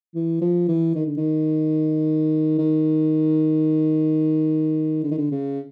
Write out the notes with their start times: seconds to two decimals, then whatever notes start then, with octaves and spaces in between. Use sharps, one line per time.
0.14 E3
0.41 F3
0.68 E3
0.95 D#3
1.06 D3
1.17 D#3
2.58 D#3
5.03 D3
5.11 D#3
5.18 D3
5.32 C#3